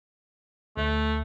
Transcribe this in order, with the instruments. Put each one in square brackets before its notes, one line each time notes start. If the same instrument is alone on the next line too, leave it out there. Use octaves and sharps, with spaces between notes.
[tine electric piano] D2 [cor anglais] A3